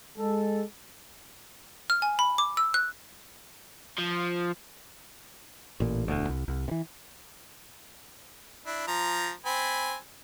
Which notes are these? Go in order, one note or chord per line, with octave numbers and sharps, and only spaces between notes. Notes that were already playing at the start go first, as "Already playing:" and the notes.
G#3 A4
F6
G#5
B5
D6
E6
F#6
F3
A1 A#2
E1 D2
C2
C2
C3 E3
D4 E4
F3 A#5
C4 G#5 B5